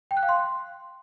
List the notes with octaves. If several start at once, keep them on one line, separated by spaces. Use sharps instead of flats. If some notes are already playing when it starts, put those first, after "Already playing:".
G5
F#6
F5
C6